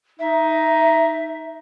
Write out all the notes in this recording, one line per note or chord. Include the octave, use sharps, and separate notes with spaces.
D#4 E5